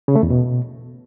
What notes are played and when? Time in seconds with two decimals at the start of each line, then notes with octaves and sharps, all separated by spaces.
0.08 C#3
0.16 A3
0.23 E2
0.30 B2